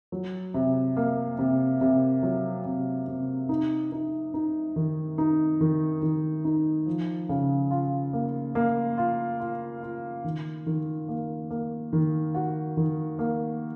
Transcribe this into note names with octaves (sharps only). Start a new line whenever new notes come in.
F#3
C3
A#3
C3
C3
F#3
C3
C3
D#4
D#4
D#4
D#3
D#4
D#3
D#3
D#4
F3
C#3
F4
A#3
A#3
F4
F4
F4
D#3
D#3
A#3
A#3
D#3
F#4
D#3
A#3